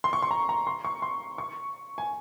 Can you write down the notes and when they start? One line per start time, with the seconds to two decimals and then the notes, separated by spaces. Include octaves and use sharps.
0.04 C6
0.13 C#6
0.22 C6
0.31 A#5
0.49 A#5
0.67 C6
0.85 C#6
1.02 C6
1.38 C#6
1.98 G#5